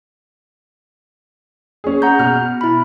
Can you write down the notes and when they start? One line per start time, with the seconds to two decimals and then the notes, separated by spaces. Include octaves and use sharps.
1.84 C#4 G#4
2.02 F#5 A#5 G6
2.19 B2 F6
2.61 E4 B5